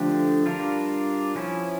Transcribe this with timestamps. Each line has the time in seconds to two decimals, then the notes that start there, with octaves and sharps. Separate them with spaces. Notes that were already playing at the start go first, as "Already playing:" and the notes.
Already playing: D3 F3 A3 D4 G4
0.46 G3 D4 F4 A#4
1.35 F3 C#4 E4